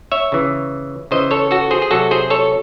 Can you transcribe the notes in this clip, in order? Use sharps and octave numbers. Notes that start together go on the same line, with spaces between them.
C#5 E5
C#3 E3
C#3 E3 C5 D#5
A4 C#5
F#4 A4
G#4 C5
G#4
C3 F#3 F#4 A4
G#4 C5
A4 C#5